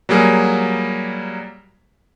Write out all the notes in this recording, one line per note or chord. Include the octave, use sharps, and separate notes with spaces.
F#3 G3 A#3 G#4